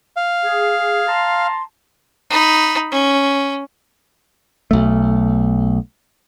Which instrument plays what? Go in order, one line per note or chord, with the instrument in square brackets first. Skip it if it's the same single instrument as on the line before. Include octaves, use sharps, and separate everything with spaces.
[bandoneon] F5
[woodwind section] G#4
A5 A#5 C6
[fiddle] D#4 B5
C#4
[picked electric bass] B1 A3